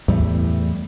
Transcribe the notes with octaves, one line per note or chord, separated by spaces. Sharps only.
E2 A2 G3 A3